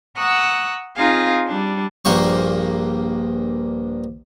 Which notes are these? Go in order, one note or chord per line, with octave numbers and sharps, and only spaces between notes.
F#5 A#5 C#6 D#6 E6 F#6
C4 D#4 F4 G#4 F5
G3 D4
A#1 G2 A#3 C5 C#6